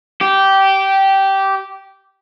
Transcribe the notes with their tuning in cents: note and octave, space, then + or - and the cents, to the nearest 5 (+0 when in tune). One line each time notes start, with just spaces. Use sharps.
G4 -15